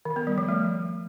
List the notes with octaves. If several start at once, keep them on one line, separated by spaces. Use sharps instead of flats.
D#3
B3
G3
F3
A3